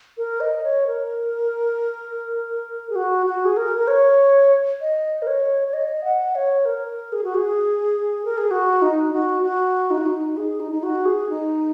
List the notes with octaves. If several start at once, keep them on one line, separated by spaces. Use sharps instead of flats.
A#4
D#5
C#5
A#4
G#4
F#4
F#4
G#4
A#4
A#4
C#5
D#5
A#4
C#5
C#5
D#5
F#5
C#5
A#4
G#4
F#4
G#4
A#4
G#4
F#4
D#4
F#4
F#4
D#4
F#4
D#4
G#4
D#4
D#4
F#4
G#4
D#4